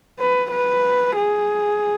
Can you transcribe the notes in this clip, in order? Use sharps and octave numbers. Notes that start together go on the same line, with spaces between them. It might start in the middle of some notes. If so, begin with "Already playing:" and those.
B4
B4
G#4